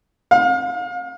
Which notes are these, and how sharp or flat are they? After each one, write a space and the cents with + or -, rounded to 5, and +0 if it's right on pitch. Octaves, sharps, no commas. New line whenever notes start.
F5 +35